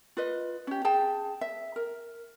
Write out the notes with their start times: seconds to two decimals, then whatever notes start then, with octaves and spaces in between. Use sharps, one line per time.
0.17 F4 B4 D#5
0.67 C#4 G4
0.85 G#4 G5 A5
1.41 E5
1.76 A#4